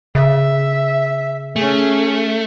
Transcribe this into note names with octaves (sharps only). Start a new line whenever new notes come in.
C#3 E5
A3 C#4 G#4